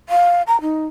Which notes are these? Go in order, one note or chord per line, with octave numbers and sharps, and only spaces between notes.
F5
A#5
D#4